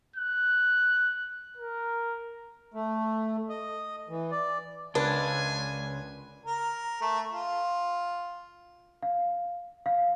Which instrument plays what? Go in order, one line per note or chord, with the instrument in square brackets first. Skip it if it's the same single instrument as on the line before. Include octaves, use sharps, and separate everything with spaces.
[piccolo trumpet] F#6
A#4
[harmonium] A3
D#5
E3
D5
[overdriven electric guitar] C#2 [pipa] D4 [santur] B4 [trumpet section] G#5
[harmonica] A#4
A3
F4
[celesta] F5
F5